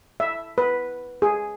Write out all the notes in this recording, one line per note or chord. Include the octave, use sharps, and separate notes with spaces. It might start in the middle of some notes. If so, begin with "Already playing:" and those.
E5
B4
G#4